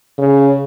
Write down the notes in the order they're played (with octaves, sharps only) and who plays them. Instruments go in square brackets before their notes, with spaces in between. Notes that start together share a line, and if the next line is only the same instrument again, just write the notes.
[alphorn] C#3